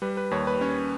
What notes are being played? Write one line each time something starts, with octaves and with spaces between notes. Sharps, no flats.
G3 B4
B4
D#2 C#5
B4
C#4 C#5